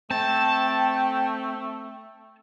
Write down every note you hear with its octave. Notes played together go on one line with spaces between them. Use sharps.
A3 C4 G5 A5